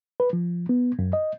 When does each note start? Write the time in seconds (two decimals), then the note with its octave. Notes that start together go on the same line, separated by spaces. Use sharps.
0.20 B4
0.33 F3
0.69 B3
0.99 F#2
1.13 D#5